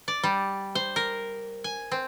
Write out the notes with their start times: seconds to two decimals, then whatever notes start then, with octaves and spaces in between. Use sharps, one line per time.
0.08 D5
0.23 G3
0.75 C5
0.96 A#4
1.64 G#5
1.91 C4